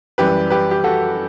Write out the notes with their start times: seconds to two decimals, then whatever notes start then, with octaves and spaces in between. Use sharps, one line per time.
0.18 F#2 E3 G3 G4 B4
0.50 G4 B4
0.71 G4
0.84 F#4 A4